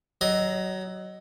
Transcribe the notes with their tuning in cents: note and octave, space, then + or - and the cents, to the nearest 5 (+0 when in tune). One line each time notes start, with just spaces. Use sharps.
F#3 +20 D#5 -5